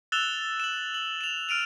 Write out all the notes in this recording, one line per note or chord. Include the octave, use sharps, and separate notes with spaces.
E6 F#6 A6 E7 F7 G7
E7 F#7
F#7
E7 F7
F6 D7 D#7 F7